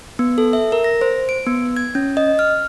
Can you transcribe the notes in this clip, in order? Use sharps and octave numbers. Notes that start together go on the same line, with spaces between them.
B3
A4
E5
A#4
A#6
C5
D7
B3
G#6
C#4
D#5
F6